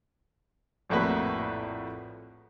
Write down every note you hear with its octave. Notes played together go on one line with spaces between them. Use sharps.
A#1 F2 A2 A#3 F#4 B4